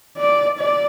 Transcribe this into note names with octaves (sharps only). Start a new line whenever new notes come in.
D5
D5